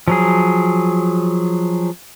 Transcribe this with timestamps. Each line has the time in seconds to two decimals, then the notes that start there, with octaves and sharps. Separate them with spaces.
0.08 F3 F#3 G#4